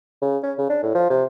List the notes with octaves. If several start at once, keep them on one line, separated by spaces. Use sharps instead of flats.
C#3
C#4
C#3
D4
A2
F3
C3